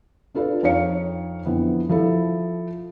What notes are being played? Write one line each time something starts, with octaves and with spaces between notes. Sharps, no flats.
D4 F4 A4 B4 D5
F2 D#4 C#5 F5 C#7
F2 D3 E3 B3
F3 E4 A4